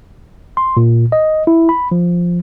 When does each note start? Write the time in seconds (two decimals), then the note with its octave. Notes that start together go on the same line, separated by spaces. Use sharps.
0.57 C6
0.77 A#2
1.12 D#5
1.47 E4
1.69 B5
1.92 F3